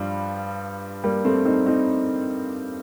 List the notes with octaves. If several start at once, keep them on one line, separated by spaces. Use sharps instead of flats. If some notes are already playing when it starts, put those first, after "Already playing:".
Already playing: G2 F3 G3
G3 A#3
A3 C4
C4 D#4
C4 D#4